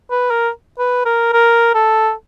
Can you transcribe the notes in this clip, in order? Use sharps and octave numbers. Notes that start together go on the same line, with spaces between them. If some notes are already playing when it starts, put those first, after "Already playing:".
B4
A#4
B4
A#4
A#4
A4